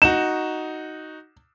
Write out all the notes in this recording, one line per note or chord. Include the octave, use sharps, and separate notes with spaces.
D#4 F#4 E7